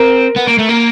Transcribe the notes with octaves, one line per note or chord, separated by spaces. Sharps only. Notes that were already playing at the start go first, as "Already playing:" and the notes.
Already playing: C4 A#4
B3
A#3
A3
A#3